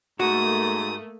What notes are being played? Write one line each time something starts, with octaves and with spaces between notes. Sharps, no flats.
G#2 A3 A#3 F#4 D#6